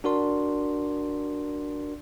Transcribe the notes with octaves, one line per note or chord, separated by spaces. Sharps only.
D4 F#4 A#4 D5 C6